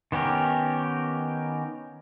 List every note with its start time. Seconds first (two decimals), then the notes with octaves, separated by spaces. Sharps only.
0.12 D#3 B3 C#4 G4 A#4